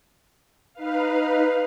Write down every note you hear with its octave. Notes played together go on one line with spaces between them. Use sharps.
D#4 B4 F5